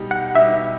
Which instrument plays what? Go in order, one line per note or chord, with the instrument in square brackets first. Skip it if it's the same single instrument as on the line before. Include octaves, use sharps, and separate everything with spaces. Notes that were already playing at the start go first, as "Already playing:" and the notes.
Already playing: [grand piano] B2 G3 D#4 G4
[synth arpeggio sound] F#5
[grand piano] B2 G3 D#4 G4 [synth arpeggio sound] E5